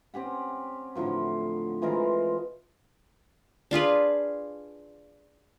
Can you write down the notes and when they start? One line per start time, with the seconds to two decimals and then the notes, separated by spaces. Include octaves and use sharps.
0.14 C4 C#4 G4 F#5
0.95 A2 D3 F3 F#3
1.82 E3 F3 G#3 A#4
3.71 D4 F4 G#4 B4